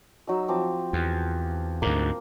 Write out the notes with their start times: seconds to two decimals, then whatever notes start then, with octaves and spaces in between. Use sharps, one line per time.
0.27 F#3 D#4 E6
0.48 F3 C4 D6
0.93 E2
1.82 D2 G#2 A#3